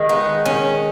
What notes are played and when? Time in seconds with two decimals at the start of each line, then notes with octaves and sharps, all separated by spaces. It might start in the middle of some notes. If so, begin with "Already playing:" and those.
Already playing: D#3 G#3
0.09 B3 D#4
0.46 C#4